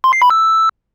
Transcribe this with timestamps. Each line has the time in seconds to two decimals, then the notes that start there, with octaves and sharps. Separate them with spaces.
0.04 C6
0.13 C7
0.22 B5
0.30 E6